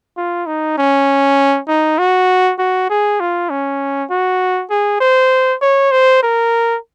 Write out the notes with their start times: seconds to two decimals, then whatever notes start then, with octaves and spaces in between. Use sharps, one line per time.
0.17 F4
0.47 D#4
0.78 C#4
1.68 D#4
1.98 F#4
2.58 F#4
2.89 G#4
3.20 F4
3.50 C#4
4.10 F#4
4.70 G#4
5.00 C5
5.61 C#5
5.91 C5
6.23 A#4